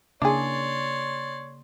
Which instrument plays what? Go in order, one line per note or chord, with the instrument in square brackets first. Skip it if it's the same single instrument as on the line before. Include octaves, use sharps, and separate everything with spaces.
[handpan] C#3 A#3 [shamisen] D4 E4 G#4 [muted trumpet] C#5 [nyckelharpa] D5 C6